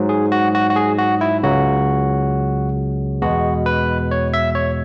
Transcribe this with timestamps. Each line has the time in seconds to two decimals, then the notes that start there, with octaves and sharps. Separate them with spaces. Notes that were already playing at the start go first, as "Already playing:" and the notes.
Already playing: G#2 F#3
0.09 G#4
0.32 F#4
0.55 F#4
0.70 F#4
0.76 G#4
0.98 F#4
1.21 E4
1.43 C#2 C#3 F#3 F#4
3.22 E2 B2 G#3 F#4
3.66 B4
4.11 C#5
4.34 E5
4.55 C#5